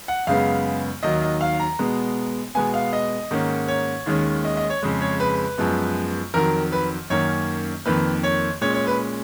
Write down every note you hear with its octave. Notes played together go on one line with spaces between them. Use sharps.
F#5
F#2 C#3 G#3 B3 F5
D#2 D#3 F#3 D#5
D#5
F5
A#5
B2 G#3 B3
B2 G#3 B3 G#5
F5
D#5
G#2 D#3 A#3 C#4
C#5
D#2 D#3 G#3 C#4
D#5
D#5
C#5
F2 C#3 G#3
C#5
B4
F#2 F3 G#3 B3
F2 D#3 F#3 A#4
B4
F#2 D#3 A#3 C#4 C#5
F2 D#3 A#3 B4
C#5
A#2 G#3 C#4 C#5
C#5
B4